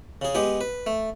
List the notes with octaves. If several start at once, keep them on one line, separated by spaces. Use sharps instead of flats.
C#3 G#4
G#3 B3 G4 G#4
B4
A3